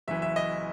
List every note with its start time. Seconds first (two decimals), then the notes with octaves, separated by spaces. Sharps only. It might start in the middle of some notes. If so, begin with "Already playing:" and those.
0.08 F#1 F#2 E3 E5
0.22 E5
0.36 D#5